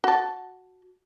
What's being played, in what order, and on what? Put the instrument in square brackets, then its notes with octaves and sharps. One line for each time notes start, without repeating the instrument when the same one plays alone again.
[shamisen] F#4 A5